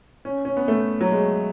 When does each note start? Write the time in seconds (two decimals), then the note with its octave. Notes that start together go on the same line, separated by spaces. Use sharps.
0.25 C#4
0.45 C#4
0.57 B3
0.68 A3
1.01 F#3
1.11 G#3